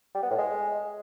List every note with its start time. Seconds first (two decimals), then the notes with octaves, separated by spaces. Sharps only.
0.15 G3
0.23 B3
0.31 A2
0.38 G#3